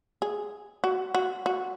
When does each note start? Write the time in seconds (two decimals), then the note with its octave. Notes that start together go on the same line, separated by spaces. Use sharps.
0.22 G#4
0.84 F#4
1.15 F#4
1.46 F#4